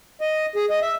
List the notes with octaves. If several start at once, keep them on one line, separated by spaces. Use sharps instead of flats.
D#5
G#4
D#5
E5